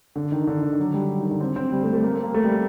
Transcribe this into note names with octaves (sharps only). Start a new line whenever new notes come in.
D3
D#3
D3
D#3
F#3
G3
D#3
D3
C4
C4
G3
A3
A3
A#3
C4
A#3
A3
G3